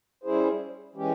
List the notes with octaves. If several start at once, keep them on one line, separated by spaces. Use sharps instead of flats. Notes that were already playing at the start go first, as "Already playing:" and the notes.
G3 C#4 E4 G#4 C5
E3 G#3 C#4 G4